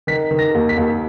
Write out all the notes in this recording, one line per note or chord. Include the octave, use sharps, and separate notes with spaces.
D#3 B6
D#3
A#6
D#2
B6
D#2